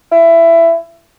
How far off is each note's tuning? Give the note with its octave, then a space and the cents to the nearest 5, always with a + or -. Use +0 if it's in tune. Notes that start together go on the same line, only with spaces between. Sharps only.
E4 +20